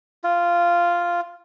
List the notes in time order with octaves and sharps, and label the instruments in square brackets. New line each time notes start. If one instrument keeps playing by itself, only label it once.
[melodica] F4